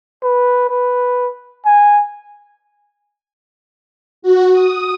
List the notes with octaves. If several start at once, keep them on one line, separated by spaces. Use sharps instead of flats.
B4
B4
G#5
F#4
D#6